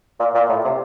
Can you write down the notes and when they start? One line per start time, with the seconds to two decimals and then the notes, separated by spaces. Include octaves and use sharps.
0.19 A#2
0.34 A#2
0.49 A2
0.64 C3